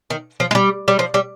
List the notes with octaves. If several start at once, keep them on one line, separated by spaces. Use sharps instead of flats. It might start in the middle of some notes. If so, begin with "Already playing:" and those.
D#3
F3
G#3
G3
G3
F3
G3